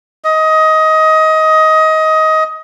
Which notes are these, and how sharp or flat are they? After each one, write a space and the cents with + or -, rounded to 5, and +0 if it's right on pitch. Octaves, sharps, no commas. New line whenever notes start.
D#5 +20